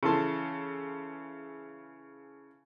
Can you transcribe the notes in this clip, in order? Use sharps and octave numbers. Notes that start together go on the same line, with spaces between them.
C#3 E3 A4 A5 C6